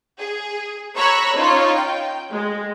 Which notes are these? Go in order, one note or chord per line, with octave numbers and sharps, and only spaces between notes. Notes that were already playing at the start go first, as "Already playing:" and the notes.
G#4
C#5 A#5 B5 C#6 E6 F#6
C#4 D#4 F4 C#5
G5
G#3